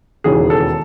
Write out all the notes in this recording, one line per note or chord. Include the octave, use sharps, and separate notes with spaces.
E1 D#2 C#3 E3 G#4
A4